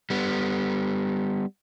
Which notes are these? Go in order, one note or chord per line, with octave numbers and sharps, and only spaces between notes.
G3 B3